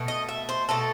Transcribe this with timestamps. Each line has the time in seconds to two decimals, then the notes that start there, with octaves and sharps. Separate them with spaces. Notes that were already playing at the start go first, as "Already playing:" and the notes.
Already playing: B2 A3
0.08 D#5
0.29 E5
0.49 C5
0.69 B2 A3 A4